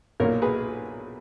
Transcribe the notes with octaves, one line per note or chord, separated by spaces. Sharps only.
B1 A#2 A#3 A#4 C#5
G#4 B4